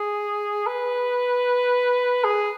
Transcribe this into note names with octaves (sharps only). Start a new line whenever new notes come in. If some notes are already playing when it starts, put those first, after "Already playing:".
Already playing: G#4
B4
G#4